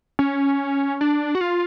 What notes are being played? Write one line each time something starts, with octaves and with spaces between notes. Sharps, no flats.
C#4
D4
F#4
F4